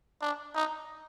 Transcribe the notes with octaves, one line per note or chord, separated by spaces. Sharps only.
D4
D#4